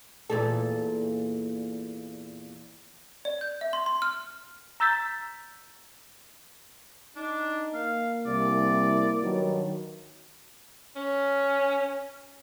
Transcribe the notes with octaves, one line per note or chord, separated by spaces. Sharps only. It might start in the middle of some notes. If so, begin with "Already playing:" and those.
E2 A#2 A4
D5
G6
E5
C6
C6
F6
A#5 E6 G6 A6 B6
D4 D#4
A#3 F5
C2 E4 D5
G2 D#3 F#3
C#4